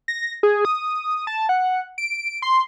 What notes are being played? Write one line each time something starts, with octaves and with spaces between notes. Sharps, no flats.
A#6
G#4
D#6
A5
F#5
D7
C6